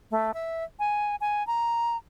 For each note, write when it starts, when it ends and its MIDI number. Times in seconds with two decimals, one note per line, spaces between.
0.11 0.31 57
0.34 0.64 76
0.79 1.16 80
1.21 1.46 80
1.47 1.97 82